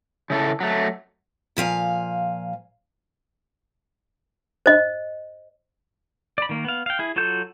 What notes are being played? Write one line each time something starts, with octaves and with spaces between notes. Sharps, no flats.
C#3 E4 A4
F#3 A3
A#2 F3 F5 G#5
C5 D#5
D5 B5
D#3 A#3
B3 F5
F5 G5
E4 G#4
F#3 F4 F#4 A4 G6